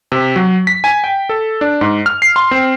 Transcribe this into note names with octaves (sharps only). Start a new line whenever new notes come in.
C3
F#3
B6
G#5
G5
A4
D4
G#2
F6
C7
C6
C4